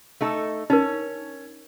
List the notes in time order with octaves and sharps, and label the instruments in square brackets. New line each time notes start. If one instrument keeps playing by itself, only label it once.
[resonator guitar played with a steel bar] A3 D#4 A4
[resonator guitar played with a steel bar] C#4 [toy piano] D#4 A#4